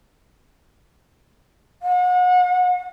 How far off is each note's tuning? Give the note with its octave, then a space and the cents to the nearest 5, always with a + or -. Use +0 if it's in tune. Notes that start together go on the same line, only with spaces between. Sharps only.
F#5 -35